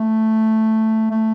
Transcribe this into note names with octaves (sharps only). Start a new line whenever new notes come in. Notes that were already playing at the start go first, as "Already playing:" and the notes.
Already playing: A3
A3